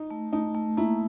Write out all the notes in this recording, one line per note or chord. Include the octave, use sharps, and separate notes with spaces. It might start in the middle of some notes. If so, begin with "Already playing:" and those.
Already playing: D#4
A3
A3 D#4
A3
A#3 E4